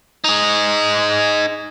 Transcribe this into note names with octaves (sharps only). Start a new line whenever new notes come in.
D#4 G#4